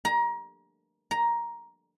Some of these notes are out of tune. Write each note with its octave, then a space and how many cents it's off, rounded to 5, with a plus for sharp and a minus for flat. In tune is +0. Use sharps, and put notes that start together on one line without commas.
A#5 +25
A#5 +10